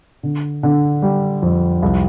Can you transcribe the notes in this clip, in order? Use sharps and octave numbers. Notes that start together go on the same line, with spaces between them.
D3
D3
G3
F2
C2